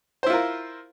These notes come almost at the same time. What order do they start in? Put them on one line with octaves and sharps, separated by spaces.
C5 E4 F4 A#4